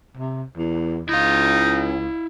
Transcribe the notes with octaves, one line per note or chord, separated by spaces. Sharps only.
C3
E2
C#2 D#4 E4 F5